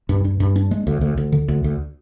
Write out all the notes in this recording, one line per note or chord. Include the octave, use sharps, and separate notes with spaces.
G2
G2
G2
D4
G#3
D2
D2
D2
D3
D2
D2